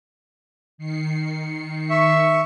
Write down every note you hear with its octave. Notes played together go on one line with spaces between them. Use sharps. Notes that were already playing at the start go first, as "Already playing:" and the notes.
D#3 C7 C#7
E5 C#6